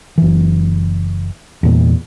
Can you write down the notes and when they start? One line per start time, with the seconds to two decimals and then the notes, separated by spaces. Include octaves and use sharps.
0.18 F#1 E3
1.63 E2 A#2